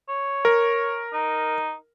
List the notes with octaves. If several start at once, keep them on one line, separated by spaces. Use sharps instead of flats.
C#5
A#4
D#4